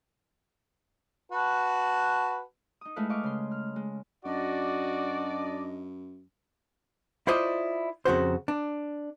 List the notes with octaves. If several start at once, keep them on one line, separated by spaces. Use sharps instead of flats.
F#4 B4 A5
D#4 D#6
G#3 A3 E4 B4 E5 F5
D#5 F5 C#6 D6
C#3 C6
F6
G#3
F#2 D4 F#4 D5 D#5
E4 F4 C5 D5 D#5
F2 C#3 F#4 C5
D4